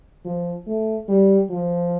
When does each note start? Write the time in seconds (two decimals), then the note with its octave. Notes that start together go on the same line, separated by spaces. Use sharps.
0.25 F3
0.67 A3
1.09 G3
1.50 F3